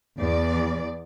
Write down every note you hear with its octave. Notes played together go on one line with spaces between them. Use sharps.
E2 D5